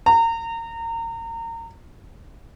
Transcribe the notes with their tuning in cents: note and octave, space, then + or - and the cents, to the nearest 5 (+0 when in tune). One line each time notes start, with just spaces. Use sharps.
A#5 -30